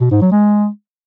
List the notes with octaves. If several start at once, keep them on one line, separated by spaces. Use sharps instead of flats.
B2
G#2
F#3
G#3